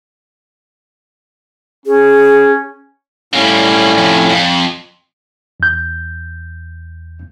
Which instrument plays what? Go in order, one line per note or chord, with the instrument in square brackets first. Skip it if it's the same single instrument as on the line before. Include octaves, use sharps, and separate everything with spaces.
[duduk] C#4 [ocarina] G#4
[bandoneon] A2 C#4 [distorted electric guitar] G3 A#3
[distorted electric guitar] F2 C3
F2
[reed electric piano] E2 G6